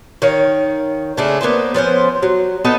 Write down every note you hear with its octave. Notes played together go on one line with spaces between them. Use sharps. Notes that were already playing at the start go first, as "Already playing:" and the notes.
D#3 C#5 F5
C#3 G#3 A3 D4
A#3 B3 B4 C5
F3 B3 C#4 C5
F#3
B3 D#4 A4 D#5